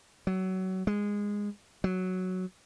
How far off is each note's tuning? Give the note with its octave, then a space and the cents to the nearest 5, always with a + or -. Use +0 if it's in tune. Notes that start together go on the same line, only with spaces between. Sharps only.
F#3 +20
G#3 -15
F#3 +0